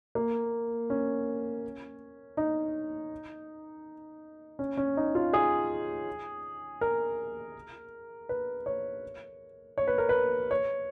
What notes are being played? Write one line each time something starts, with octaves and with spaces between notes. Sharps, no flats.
A#3
C#4
D#4
C#4
C#4
D#4
F4
G#4
A#4
B4
C#5
C#5
B4
A#4
B4
C#5